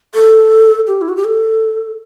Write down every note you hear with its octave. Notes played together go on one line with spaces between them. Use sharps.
A4
G4
E4
F#4
G4
A4